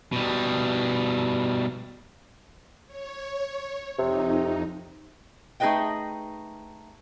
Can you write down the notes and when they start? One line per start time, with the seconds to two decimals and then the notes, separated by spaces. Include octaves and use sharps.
0.12 B2 G3
2.87 C#5
3.99 F2 C3 D#4
5.60 A3 D#4 G#4 B4 D#5 G5